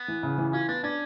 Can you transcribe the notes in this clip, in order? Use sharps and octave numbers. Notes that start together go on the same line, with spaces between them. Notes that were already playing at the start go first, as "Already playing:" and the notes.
Already playing: B3
E3
C#3
E3
C#4 F4
B3 D4
C#4 D4